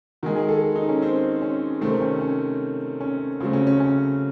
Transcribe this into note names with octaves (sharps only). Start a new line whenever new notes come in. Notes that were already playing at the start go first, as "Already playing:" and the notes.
D#3 G#3 F#4
G#4
A4
D#4
C#4
C4
C#4
C3 D#3 A3 C4
C#4
C#4
C#4
C#3 F#3 A3 C4
C#4
C#4
C#4